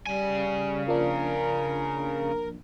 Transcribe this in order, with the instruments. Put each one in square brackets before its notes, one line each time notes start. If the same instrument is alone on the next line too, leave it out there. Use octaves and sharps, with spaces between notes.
[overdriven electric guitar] C#3 G#5 [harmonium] G3
[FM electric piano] F3 A#3 D4 [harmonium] A#4